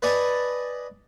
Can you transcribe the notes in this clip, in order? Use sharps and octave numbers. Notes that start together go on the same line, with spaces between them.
B4 D5 D#5 G#5 A5 B5